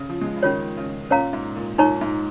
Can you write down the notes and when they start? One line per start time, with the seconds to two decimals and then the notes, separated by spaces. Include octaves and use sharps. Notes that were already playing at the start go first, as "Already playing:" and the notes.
Already playing: C#3
0.10 F3
0.21 G#3
0.26 F3
0.36 C#3
0.43 D#3 C#4 F4 C#5
0.77 C#3
1.10 A#2 C#4 A#4 C#5 F5 A#5
1.33 G#2
1.56 A#2
1.78 A#2 D#4 C#5 A#5 C#6
2.01 G#2